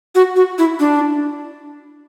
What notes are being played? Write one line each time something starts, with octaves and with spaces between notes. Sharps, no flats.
F#4
F#4
E4
D4